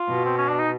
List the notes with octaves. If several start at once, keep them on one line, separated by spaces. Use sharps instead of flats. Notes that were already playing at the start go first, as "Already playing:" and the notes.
Already playing: F4
B2
C4
C#4
D4
D#4